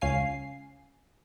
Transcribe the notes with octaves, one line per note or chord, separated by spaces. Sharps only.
C#2 C#4 F5 G#5 C7